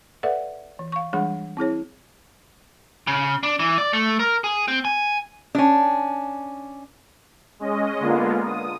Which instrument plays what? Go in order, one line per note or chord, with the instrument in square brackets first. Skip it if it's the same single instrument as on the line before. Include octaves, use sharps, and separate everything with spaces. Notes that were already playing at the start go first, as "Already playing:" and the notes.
[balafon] A4 B4 D5 E5 F#5
E3
F5 C#6
E3 G3 G#3 D4 G#4 F#5
C4 E4 G#4 C#5
[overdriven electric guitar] C#3
D4
E3
D5
A3
A#4
G#4
C4
G#5
[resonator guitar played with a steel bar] C#4 D4
[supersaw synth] G#3 C#4 D#5
D3 G#3 A#3 B3 F4
D#6